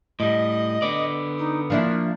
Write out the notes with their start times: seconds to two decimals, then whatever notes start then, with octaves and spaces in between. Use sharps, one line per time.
0.20 A2 G3 D#5
0.82 D3 B3 D5
1.39 D#4
1.70 F3 A#3 D4 E4